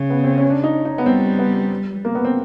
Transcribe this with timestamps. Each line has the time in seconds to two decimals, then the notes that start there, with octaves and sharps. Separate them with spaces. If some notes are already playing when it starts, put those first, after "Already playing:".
Already playing: C#3
0.10 B3
0.24 C4
0.38 C#4
0.50 D4
0.63 D#4
0.85 D#4
0.98 B3
1.06 G3 C4
1.39 B3
2.05 A#3
2.15 B3
2.25 C4